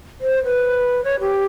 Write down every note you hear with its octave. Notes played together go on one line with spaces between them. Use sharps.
C5
B4
C#5
G4